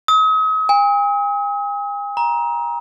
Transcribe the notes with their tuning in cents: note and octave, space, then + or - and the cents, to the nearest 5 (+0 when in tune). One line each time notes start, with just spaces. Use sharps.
D#6 +40
G#5 -45
A#5 +20